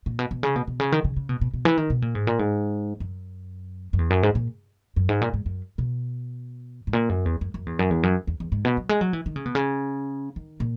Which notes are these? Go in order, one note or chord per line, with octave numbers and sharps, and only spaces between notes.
A#2
B2
B2
C#3
B2
B2
C#3
D#3
C#3
C#3
B2
B2
B2
E3
D#3
B2
A#2
G#2
A#2
G#2
F#2
F#2
E2
F#2
G#2
A#2
F#2
G#2
A#2
G#2
F#2
B2
G#2
A#2
F#2
E2
F#2
F#2
E2
F#2
E2
F#2
E2
E2
G#2
B2
F#3
G#3
F#3
E3
D#3
C#3
B2
C#3
D#3
A#2